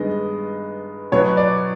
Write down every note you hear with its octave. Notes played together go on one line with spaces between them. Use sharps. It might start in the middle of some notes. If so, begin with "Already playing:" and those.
Already playing: G2 D#3 G#3 B3 D#5
B2 F#3 B3 C#5
D5